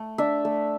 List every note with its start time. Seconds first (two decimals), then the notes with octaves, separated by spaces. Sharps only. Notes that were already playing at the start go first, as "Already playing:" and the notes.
Already playing: A3
0.18 D4 E5
0.45 A3